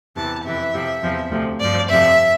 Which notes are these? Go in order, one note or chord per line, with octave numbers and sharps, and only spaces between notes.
E2 C3 E3 A5
F2 C3 E3 E5
F2 C3 F3
E2 C3 F3
D2 C3 F3
G2 F3 D5
F2 C3 F3 E5